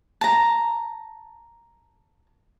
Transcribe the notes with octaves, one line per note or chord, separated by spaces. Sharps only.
A5 A#5